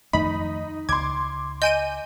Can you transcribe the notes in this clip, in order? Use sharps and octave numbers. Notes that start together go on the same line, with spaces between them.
F2 D#3 A3 D#4 B5
C#2 C6 D6 G#6
D#5 G#5 G6 D7 D#7